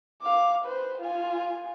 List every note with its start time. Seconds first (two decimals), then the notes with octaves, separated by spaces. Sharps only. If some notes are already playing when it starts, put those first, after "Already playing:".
0.22 F5 D6
0.65 B4 C5
1.01 F4 G#5